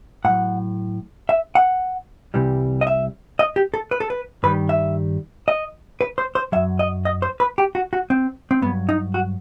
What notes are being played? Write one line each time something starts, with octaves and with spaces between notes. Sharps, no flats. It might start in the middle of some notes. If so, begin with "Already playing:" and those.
A2 F#3 F#5
E5
F#5
C2 C3 E3 G3
D#5
E5
D#5
G4
A4
B4
A4
B4
G2 D#3 G3 B4
E5
D#5
B4
C5
C5
F#2 F#3 E5
D#5
D#5
C5
B4
G4
F#4
F#4
C4
C4
G2 F#3 B3
D#4
F#4